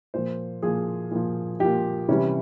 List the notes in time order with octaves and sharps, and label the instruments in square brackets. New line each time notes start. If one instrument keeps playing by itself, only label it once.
[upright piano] A#2 F3 C5
A#2 F3 G#4
A#2 F3
A#2 F3 G4
C3 E3 G3 C#4